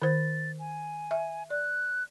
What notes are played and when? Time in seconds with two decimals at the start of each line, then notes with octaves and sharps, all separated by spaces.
0.02 D#3 C5 A6
0.59 G#5
1.11 E5
1.50 D5 F#6